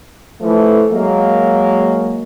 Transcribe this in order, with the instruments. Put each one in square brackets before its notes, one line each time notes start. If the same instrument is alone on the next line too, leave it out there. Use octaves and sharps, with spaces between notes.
[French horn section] E3 F3 A3
F#3 G#3 A#3